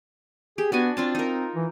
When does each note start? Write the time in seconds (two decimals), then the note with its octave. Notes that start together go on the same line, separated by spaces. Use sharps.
0.58 G4 G#4
0.72 B3 D4 F#4 G#5
0.97 C4 D4 F4 A5
1.15 D#4 A#4
1.55 E3